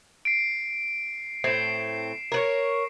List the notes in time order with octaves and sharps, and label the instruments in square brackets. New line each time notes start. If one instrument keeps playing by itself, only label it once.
[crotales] C7 D7
[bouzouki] A2 C4 [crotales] C7 E7
[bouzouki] A#4 B4 C#5